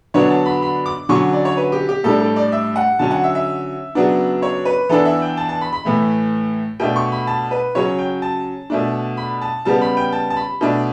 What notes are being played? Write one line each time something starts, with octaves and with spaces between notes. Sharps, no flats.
D3 F#3 B3 D4 C#5
A5
B5
B5
D6
D3 F#3 C#4 C#6
D5
C#5
B4
G4
G4
A2 G3 D4 A4
A4
D5
E5
F#5
D3 F#3 C#4 A5
F#5
E5
E5
C#3 F#3 B3 D4
C#5
B4
E3 B3 D4 A4
E5
G5
A5
A5
B5
B5
A2 E3 A3
B2 A3 D4 G5
C#6
B5
A5
B4
C#3 F#3 C#4 C#5
G5
A5
B2 A3 D4
B5
A5
C#3 G3 B3 A5
B5
G5
A5
A5
B5
B2 A3 D4